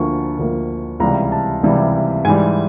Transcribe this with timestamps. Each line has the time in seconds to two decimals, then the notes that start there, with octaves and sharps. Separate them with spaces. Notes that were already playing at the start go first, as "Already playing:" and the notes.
Already playing: D2 D3 F3 A#3 C#6
0.39 D2 D3 F3 A#3
1.00 C#2 C3 E3 G3 A#5
1.32 A5
1.63 C#2 C3 E3 G3
2.25 G#2 E3 G3 G#5